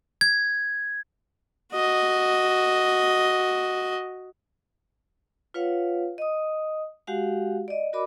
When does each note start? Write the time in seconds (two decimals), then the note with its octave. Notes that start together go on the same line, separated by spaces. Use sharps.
0.21 G#6
1.73 F#4 D#5
5.54 F4 B4 C#5 F5 F#5
6.18 D#5 D#6
7.07 G#3 F#4 G4 F5 F#5
7.68 D5 D#5
7.93 F#4 A#4 D5 D#5 B5 D6